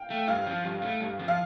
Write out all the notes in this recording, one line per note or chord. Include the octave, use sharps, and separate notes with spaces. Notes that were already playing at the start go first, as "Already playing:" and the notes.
Already playing: F5 G5
A3
G2 F5
F3
G2
A3
G2
F3
F5